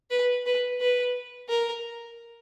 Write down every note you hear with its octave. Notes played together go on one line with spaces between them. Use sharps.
B4
B4
B4
A#4